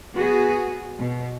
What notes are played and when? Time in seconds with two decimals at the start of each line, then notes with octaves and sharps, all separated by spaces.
0.15 B3 F#4 G#4
0.98 B2